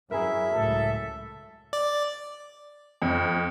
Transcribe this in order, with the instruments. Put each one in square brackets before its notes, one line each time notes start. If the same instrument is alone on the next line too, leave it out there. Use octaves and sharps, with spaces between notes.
[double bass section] F#2 F#3 [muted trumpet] E4 [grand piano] G#4 A#4 [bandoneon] E5
[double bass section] C#2 A2 [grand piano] F#3 [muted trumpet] A4
[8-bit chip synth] D5
[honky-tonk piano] F2